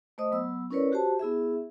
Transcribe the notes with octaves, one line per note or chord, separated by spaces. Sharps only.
A3 C5 D#5 D#6
F#3 B3 E6
C#4 E4 A#4 B4 C#5 D5
F#4 G4 C5 A5
B3 E4 G#4 E5